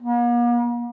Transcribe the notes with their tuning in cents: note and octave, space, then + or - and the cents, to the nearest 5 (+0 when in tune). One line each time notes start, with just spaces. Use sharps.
A#3 +45